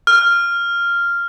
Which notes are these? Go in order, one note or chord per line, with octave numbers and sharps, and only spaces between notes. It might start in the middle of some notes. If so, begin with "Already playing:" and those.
F6